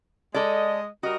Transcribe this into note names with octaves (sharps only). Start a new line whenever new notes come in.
G#3 A4 D5 D#5
G3 F#4 A#4 D#5